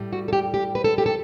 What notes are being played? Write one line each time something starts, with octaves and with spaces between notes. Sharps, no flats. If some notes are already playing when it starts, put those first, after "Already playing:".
Already playing: A2 G3
F#4
A4
G4
G4
B4
A4
G4
A4